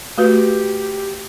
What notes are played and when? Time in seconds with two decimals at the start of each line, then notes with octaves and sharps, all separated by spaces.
0.18 A3 F#4 G4 B4